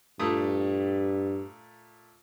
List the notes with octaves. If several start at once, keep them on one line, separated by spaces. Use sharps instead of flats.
G2 A#2 A3 D#6